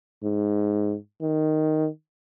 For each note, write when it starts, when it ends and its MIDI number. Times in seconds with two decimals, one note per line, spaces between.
0.24 0.96 44
1.22 1.88 51